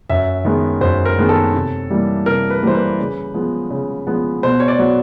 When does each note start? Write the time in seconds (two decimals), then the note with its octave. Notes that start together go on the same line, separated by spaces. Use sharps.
0.09 F#2 E5
0.45 D#3 G#3 B3
0.81 F#2 C5
1.05 A#4
1.18 D#3 G#3 B3
1.29 A4
1.54 C3
1.90 E3 G3 A#3
2.26 C3 A#4
2.50 B4
2.63 E3 G3 A#3 C5
2.75 B4
2.99 C#3
3.34 F3 G#3 B3
3.70 C#3
4.07 F3 G#3 B3
4.43 B2 C5
4.60 C#5
4.68 D5
4.79 F#3 B3